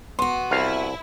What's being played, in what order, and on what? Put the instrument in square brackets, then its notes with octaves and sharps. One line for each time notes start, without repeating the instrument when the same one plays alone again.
[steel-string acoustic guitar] B3 F#4 [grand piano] C6
[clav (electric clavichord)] C2 F5 [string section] E4